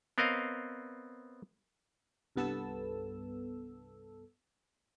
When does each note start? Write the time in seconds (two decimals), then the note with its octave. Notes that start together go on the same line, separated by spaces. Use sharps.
0.18 B3 C4 A#4 C#5 D#5 F5
2.36 C2 G2 B3 A4 A5 E6